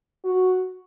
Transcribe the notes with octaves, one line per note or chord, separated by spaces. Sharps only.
F#4